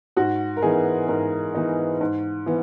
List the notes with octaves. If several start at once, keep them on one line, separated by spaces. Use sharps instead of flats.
G#2 F#4
A#4
E3 B3 D#4 G#4
G#2 A#4
E3 B3 D#4
G#2
E3 B3